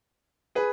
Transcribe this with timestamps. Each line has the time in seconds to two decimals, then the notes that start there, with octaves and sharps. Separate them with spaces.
0.55 G#4 B4